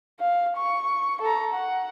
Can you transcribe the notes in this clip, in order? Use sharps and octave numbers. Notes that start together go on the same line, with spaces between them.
F5
C#6
A4 A#5
F#5